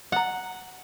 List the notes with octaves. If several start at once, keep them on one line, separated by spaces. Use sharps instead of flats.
D5 F#5 A#5